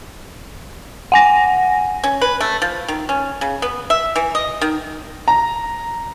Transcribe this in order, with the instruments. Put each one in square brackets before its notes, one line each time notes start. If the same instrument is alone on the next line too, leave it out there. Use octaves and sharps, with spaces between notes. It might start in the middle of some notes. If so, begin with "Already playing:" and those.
[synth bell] F#5 G#5 A#6
[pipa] C#4
B4
A3
F3
D#3
C#4
C#3
B3
E5
E3
D#5
D#3
[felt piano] A#5